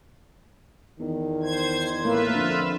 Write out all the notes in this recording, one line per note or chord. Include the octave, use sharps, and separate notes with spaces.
E2 D#3
C5 G#6
A2 A#3 F4 B4 E5
F2 D3